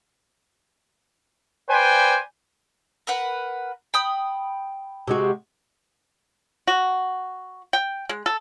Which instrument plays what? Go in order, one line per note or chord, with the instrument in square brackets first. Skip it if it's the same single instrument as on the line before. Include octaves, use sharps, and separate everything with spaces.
[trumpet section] B4 C5 D5 G5 G#5
[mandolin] A#4 B4 F#5
G5 B5 D#6
[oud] C3 G#3 F#4
[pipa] F#4
G5
G#3
A4